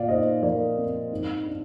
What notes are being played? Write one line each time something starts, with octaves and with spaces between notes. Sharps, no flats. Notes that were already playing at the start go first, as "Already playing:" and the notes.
Already playing: A#2 D5 F5
D#4 C5 D#5
F3 A#4 D5
C4
G#2
D4